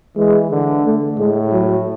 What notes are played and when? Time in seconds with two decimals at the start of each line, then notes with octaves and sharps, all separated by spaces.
0.17 E3 G#3
0.51 D3
0.85 A3
1.18 A2 G#3
1.52 F#3